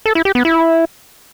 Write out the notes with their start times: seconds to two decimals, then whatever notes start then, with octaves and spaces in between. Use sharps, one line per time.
0.06 A4
0.15 E4
0.25 G4
0.35 B3
0.45 E4